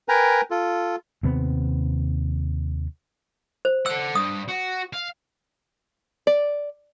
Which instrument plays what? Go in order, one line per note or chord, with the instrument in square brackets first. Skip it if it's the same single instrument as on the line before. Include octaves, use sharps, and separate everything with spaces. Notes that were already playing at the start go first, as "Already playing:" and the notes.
[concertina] A#4 B4 G5 G#5 A#5
F4 A4
[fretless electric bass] D#2 C3 B3 C4
[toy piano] C5
[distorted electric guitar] A4 F#5 [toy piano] E6
[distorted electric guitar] G2 [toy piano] D#6
[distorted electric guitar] F#4
F5
[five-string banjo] D5